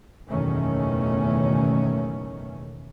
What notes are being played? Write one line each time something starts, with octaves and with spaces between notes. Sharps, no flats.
F#1 E2 B2 D#3 A3 C#4